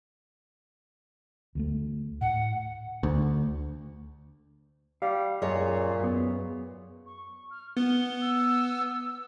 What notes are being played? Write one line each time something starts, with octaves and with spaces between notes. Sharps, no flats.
D2 G3 A3
A2 F#5
D2
G3 F5
F#2 A#2 G#4 C#5 D#5
F#2 B3
C#6
F6
B3 G7
E6